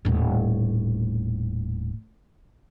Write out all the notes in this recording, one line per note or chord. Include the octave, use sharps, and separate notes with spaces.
D#1 A2